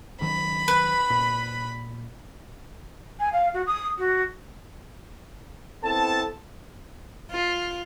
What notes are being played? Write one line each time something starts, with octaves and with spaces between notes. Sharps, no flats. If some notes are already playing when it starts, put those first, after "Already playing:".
C#2 D#3 F#3 B5
B4
A#2
G#5
F5
F#4
D#6
F#4
B3 C4 E4 A4 A5
F4